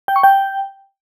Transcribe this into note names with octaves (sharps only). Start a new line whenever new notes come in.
G5
C#6
G5